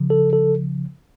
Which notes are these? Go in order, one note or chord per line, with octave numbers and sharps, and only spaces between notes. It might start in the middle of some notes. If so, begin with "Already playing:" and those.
Already playing: C#3 F3
A4
A4